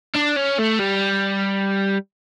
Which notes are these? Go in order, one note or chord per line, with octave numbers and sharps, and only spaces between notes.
D4
C#4
A3
G3